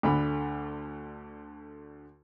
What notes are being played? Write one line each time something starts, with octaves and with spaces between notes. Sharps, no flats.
D2 D3 B5